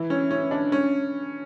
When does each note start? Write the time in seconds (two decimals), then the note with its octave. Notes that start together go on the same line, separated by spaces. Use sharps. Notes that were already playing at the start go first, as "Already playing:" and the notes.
Already playing: E3
0.10 C#4
0.31 C#4
0.51 D4
0.72 C#4